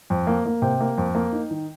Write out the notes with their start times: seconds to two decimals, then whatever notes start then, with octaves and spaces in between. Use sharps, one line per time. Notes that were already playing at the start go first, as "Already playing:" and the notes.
0.10 F2
0.27 A#3
0.46 A#3
0.62 C3 G5
0.81 A#3
0.98 F2
1.15 A#3
1.32 D#4
1.51 D#3